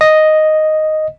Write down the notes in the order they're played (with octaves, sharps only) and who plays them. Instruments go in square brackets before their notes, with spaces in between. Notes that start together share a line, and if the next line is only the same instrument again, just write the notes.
[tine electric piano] D#5